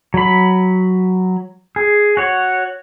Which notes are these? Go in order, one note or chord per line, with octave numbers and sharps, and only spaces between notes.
F#3 B5
G#4
F#4 C#5